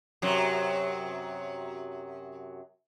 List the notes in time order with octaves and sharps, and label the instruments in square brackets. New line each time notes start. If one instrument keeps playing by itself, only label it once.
[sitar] F#2 C3 F#3